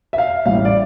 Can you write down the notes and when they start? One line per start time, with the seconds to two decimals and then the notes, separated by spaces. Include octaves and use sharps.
0.13 E5
0.18 F5
0.46 A1 A2 E3 G3 F5
0.56 E5
0.65 D5